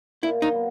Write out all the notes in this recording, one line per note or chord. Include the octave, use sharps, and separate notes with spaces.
A#2 E4
D#4
F#3 B3